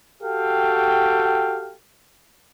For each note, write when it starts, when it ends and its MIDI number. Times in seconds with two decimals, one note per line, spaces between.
0.23 1.73 66
0.23 1.73 67
0.23 1.73 69
0.23 1.73 77
0.23 1.73 79